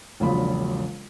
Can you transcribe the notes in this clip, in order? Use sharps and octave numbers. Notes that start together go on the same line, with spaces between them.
E1 A#1 C#3 F#3 F4 B5